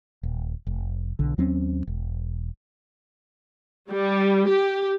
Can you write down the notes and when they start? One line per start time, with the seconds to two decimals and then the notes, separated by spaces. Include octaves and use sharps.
0.23 D#1
0.67 F1
1.19 B1 D3
1.38 D#2 F#3 C4 C#4
1.87 E1
3.90 G3
4.48 G4